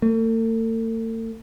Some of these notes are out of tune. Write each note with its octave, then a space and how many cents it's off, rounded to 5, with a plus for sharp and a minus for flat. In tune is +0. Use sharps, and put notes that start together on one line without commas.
A3 +45